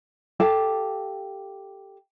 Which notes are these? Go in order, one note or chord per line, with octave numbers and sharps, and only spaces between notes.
G4 A4 F5 A5